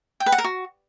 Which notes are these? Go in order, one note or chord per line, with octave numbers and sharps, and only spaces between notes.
G5
B4
F#5
A#4
F#4